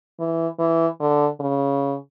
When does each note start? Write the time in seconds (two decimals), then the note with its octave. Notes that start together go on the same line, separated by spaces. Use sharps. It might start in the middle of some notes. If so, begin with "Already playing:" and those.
0.19 E3
0.59 E3
1.00 D3
1.40 C#3